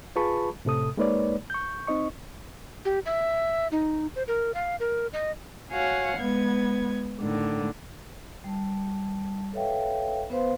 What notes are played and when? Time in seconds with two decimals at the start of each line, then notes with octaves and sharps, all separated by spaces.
0.16 F4 G#4 B4 A5 B5 C#6
0.65 A2 C3 A4 D#6
0.97 G#3 A#3 D#4 B4 C#5 D5
1.50 C#6 G6
1.87 C4 D#4 D#5 C#6
2.85 G4
3.06 E5
3.72 D#4
4.16 C5
4.28 A#4
4.54 F5
4.80 A#4
5.13 D#5
5.70 F#4 C#5 F5 F#5 G#5
6.17 G#3 B3 G#6
7.20 A2 D3 D#3
8.44 G3 A5
9.53 A4 B4 C#5 E5 F5 G5
10.30 B3 B4 C5 F5 C6